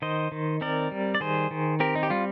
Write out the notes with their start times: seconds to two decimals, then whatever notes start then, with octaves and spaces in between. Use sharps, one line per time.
0.02 D#3 C5 D#5
0.32 D#3
0.61 C4 A#4 D5
0.91 G3
1.15 D5
1.20 D#3 G#4 C5
1.51 D#3
1.80 C4 G4 A#4
1.95 D#4
2.03 G4
2.10 G3 F4